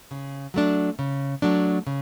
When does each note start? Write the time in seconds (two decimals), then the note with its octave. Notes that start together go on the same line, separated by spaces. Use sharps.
0.11 C#3
0.54 F#3 A3 D4
0.99 C#3
1.42 F#3 A3 D4
1.87 C#3